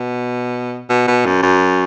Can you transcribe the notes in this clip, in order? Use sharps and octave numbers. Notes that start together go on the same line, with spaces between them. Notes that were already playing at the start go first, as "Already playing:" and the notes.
Already playing: B2
B2
B2
F#2
F#2